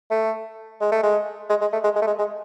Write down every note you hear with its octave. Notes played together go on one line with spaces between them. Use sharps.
A3
G#3
A3
G#3
G#3
G#3
A3
G#3
G#3
A3
G#3
G#3